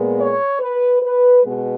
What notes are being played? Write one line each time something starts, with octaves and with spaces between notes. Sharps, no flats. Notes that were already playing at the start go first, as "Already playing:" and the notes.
Already playing: A#2 G#3 B3
C#5
B4
B4
B2 G#3 B3